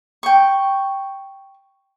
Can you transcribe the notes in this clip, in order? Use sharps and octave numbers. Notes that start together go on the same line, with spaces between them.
G5 C#6